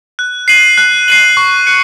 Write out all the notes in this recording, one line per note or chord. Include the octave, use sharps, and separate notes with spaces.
F#6
C7 D#7 F#7
F#6
C7 D#7 F#7
C#6
F#6 C#7